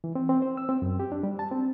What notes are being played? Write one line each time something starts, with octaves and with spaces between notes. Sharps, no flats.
E3
C4
C4
C5
E6
C4
F#2
G4
D4
G3
A5
C4